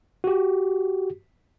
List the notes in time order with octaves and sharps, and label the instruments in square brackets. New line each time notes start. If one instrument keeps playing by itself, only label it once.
[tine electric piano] F#4 G4